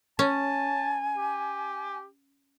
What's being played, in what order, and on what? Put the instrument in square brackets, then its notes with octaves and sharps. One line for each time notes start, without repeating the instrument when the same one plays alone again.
[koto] C#4 [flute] G#5 [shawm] A5
[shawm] G4